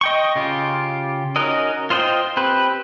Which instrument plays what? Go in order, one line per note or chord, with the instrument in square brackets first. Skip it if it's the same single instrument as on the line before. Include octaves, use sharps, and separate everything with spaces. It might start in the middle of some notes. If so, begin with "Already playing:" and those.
[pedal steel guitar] D#5 G5 C#6
C#3 F4 G4
C#4 D#4 F#4 A#4 D#5
F4 C5 D#5 F#5 G5
C4 G4 B4